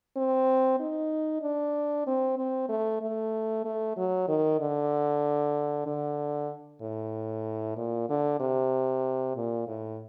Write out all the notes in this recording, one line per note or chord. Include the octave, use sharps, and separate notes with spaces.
C4
D#4
D4
C4
C4
A3
A3
A3
F#3
D#3
D3
D3
A2
A#2
D3
C3
A#2
A2